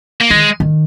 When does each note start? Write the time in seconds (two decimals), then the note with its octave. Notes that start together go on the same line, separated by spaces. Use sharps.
0.21 A#3
0.30 D#3 G#3
0.60 D#3